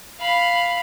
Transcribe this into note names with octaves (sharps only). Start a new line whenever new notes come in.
F5 B5